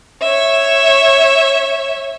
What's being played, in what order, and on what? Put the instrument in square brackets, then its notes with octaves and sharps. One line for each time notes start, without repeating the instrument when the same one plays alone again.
[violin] C#5 E5